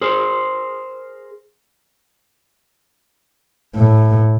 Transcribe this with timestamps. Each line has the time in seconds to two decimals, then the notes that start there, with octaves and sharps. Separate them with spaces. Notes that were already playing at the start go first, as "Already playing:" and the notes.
0.01 G#4 A#4 C5
3.76 A2